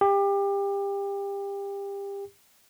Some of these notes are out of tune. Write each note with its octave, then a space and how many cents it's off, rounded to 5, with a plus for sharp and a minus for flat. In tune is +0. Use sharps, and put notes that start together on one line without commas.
G4 +25